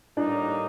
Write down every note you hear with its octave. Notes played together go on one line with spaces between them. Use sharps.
A2 G3 A#3 D4 D#4 D5